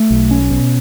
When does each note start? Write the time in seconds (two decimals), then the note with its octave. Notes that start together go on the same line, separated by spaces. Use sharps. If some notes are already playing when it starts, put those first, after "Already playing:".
Already playing: A3
0.10 B1
0.31 C#4
0.50 B2